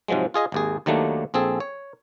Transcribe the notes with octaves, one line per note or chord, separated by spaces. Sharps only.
G#2 C3 F3 F#3 G#3
F4 G#4 D#5 G#5
G#1 D#2 G#4
D#2 D#3 F#3 A3 A#3 D4
A#1 C4 G#4 A4
C#5